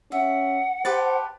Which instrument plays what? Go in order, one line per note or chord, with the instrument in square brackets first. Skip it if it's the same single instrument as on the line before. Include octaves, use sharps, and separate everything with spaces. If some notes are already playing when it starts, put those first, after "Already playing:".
[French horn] C#4 [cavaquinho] E5 [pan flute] F#5
[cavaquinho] G4 B4 A5 [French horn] C5